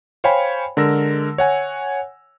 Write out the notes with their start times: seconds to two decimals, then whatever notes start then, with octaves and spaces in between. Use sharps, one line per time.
0.24 C5 C#5 F5 G5 G#5 B5
0.77 D3 G#3 A#4 E6 A#6
1.38 C#5 F#5 G#5